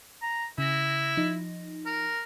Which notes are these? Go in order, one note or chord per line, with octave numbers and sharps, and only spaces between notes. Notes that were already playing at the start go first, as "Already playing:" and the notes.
A#5
C#3 E4 A#6
F3 D#4
A#4